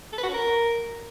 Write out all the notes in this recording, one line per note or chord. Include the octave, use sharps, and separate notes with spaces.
A4
B4
F#4
C#4
A#4